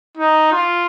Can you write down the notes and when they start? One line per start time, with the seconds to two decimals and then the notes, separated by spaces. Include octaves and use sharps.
0.17 D#4
0.52 F4